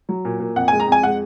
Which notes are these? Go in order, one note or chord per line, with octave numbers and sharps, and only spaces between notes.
F#3
A#2
A#2
F2 F#5
G#3 G#5
A#5
F2 G#5
G#3 F#5